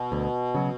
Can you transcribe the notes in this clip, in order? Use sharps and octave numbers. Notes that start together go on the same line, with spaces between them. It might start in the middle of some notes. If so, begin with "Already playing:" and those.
Already playing: B2
D2
C#3 F#3